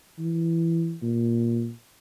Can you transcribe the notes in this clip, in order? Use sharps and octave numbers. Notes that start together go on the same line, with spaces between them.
E3
A#2